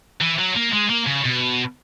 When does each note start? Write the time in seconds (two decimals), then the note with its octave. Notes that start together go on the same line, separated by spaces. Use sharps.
0.21 E3
0.38 F#3
0.56 A#3
0.72 G#3
0.89 A#3
1.06 C#3
1.25 B2